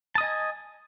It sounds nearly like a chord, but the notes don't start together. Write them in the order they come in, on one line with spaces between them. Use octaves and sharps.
A5 D#6 D#5 G#5